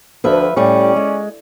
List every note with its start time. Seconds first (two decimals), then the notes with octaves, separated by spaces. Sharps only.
0.24 D2 F3 B4 E5
0.57 A2 G3 C#4 D5
0.96 G#3